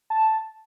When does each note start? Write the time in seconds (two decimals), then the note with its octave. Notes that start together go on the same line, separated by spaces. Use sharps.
0.10 A5